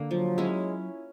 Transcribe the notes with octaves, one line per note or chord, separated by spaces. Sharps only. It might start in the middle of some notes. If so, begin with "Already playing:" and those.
Already playing: D3 A#3
F3 F#3
G#3 C#4 E4